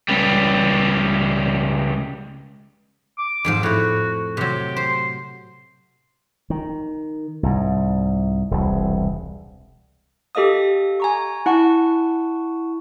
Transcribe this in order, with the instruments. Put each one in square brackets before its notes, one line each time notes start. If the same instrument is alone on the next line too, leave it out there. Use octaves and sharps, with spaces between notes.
[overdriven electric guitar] C#2 G3
[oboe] D6
[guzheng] F2 G#2 F3
[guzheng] A2 A3 [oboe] F#4
[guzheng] C3 F#3 [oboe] G4
[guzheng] C5 [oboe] C6
[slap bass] D#3
C2 G#2
E1 C2
[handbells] G4 A4 D#5 F5 D#6
G#5 A#5 C#6
E4 F#5 A5 C#6